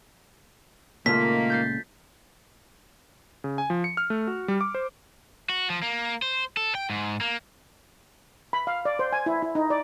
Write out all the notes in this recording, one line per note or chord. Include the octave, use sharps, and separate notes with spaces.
C#2 A#2 D#3 A3 A#3 F4 B6
G6 A6 C7
C#3
G#5
F3
C#7
F6
A3
F#4
G3
D6
C5
F#4
F3
A#3
C5
A4
G5
G#2
A#3
B5
F5
D5
C5
G#5
E4
E4
D#4
D5